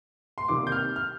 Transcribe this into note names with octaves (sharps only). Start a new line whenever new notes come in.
C6
C3 D#3 G3 A#3 D6
G6
F6
F6